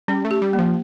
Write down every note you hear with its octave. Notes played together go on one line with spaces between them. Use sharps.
G3 C#4
A3
G4
G3
A#3
F3